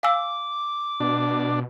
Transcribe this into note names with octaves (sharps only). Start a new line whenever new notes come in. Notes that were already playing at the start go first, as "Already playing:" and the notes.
F5 G#5 D6 E6
B2 D4